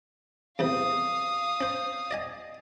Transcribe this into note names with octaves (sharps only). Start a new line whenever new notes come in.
E2 A2 C3 F5 D#6
C#4 C5
D5 D#5 G#5